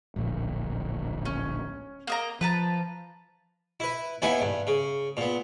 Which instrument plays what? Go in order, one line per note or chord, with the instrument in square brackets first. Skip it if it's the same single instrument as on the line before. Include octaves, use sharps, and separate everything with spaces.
[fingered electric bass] D1 A#1 A#2
[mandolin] C#4
A#3 D#5 A#5
[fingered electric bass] F3 [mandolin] B4 A5 A#5
[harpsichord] E4 B4
D#2 B3 E4 B4 G#5
G2
C#3
A#2 B3